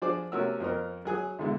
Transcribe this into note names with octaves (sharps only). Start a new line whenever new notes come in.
F3 D4 G#4 C5 D5 D6
C3 A3 C#4 F#4 A#4 E6
F2 C4 A#4
F#3 G#4 G#5 D#6
B1 D3 G#3 E4